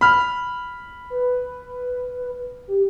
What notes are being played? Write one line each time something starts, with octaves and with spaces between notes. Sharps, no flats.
B5 F6
B4
G4